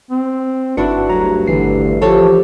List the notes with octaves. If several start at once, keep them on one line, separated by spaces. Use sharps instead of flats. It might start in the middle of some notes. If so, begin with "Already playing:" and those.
C4
G1 D4 E4 F#4 B4 C#7
D2 G2 F#3 A#5
G#1 D3 E3 C7
F3 G4 A4 C#5